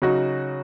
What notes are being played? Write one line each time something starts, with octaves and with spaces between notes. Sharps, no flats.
C#3 F#3 D#4 F#4